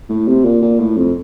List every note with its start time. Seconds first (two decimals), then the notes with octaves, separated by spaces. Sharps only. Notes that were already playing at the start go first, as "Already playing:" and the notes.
0.09 A2
0.27 C3
0.44 A#2
0.62 A#2
0.79 A2
0.97 F2